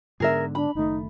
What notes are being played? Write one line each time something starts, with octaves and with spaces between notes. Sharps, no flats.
G#2 D3 B3 G#4 A#4 E5
D4 B5
F#1 D#3 A3 D#4